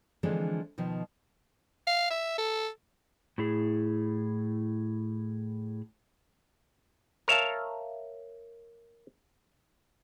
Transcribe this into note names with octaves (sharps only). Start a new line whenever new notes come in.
D3 E3 F3 G#3 C4 D4
B2 D#3 F3
F5
E5
A4
A2 E4 G#4
A#4 C#5 E5 F5 A5